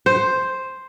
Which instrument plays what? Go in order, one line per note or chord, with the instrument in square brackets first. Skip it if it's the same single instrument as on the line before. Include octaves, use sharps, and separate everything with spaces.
[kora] C5